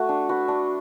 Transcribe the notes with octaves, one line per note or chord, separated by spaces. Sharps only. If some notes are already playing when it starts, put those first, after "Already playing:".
Already playing: A3 F#4
D4
F#4 B4
D4